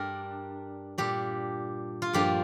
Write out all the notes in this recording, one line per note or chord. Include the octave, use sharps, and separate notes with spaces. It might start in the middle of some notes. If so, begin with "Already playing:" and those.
Already playing: G2 G3 D4 A#4
A#2 G3 D4 G4
F4
G2 F3 A#3 D4 G4